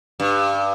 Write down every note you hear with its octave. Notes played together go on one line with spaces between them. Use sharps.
G2